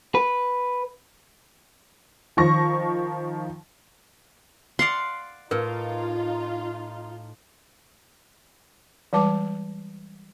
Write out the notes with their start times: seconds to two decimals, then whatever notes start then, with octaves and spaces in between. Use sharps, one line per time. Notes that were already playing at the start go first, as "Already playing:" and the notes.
0.15 B4
2.37 D#3 F3 C#6 A#6
4.79 D5 F5 F#5 C6
5.51 A2 D#4 F4 A#4 B4
9.13 E3 G3 G#3 B4 A5 D6